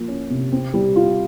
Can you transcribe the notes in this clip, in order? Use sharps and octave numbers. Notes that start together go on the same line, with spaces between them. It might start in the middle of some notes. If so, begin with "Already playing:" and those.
Already playing: F3 A#3
C#4
C3
C4
G3
F4